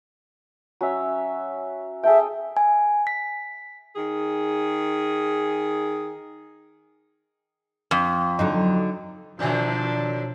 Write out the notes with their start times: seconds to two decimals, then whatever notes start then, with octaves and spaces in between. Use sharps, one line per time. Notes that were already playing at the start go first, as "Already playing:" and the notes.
0.81 F#3 C#4 E5
2.03 G#4 A4 E5 G5
2.57 G#5
3.07 B6
3.96 D#3 G#4
7.91 F2
8.39 D3 F#3 D#4
9.39 B2 D3 D#3 F3 F#3 D4 C5 G6